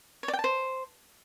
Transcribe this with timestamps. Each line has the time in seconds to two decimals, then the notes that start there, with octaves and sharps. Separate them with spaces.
0.23 C#5
0.28 D5
0.33 G5
0.39 A5
0.44 C5